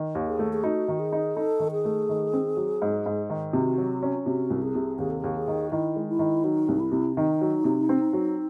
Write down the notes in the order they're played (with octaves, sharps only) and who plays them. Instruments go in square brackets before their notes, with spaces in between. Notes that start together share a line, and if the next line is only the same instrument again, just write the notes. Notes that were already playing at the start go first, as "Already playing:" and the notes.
Already playing: [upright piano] D#3
D#2
[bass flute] G#4
[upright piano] A3
[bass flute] G#4
[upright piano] D#4 [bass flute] F#4
[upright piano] D#3
[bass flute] G#4
[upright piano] D#4
[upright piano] D#4 [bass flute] A4
[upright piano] D#3
[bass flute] G#4
[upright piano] A3
D#3
C4
F#3
G#2
G#2
D#3
[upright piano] C3 [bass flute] F#4
[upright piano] F#3
C#4
[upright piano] C3 [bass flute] F#4
[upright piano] C2
[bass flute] G#4
[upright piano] C3
[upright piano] D#2 [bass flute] G#4
[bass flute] A4
[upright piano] D#2 [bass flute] G#4
[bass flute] G#4
[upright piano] D#3
[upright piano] D#3 [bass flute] E4
[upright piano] G#3
[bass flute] E4
[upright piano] D#3
[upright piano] F#3 [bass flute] D#4
[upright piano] C2
[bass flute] E4
[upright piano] C3
[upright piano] D#3 [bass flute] D#4
[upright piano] F#3
C3
C4
F#3